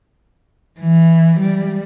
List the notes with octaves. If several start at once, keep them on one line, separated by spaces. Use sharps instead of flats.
E3
G3